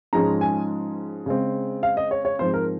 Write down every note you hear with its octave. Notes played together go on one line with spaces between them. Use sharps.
G#2 F3 G#3 C#4 A#5
G#5
C#3 G#3 C4
F5
D#5
C#5
C#5
G#2 F3 C4 C5
A#4